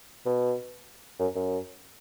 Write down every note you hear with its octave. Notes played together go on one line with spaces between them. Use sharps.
B2
F#2
F#2